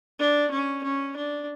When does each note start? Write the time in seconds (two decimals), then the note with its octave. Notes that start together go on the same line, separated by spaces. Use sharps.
0.20 D4
0.51 C#4
0.84 C#4
1.17 D4